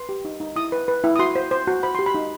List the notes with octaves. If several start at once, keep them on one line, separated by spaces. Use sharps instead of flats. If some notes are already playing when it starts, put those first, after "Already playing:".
Already playing: B4 C6
G4
D#4
D#4
E4 D#6
B4
B4
E4
D#6
F#4 C6
C5
C5
F#4
C5 B5
G4 C6
B5
D#4